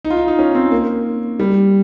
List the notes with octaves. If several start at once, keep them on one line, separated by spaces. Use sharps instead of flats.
D#4
F4
D#4
D#4
C#4
C4
A#3
G3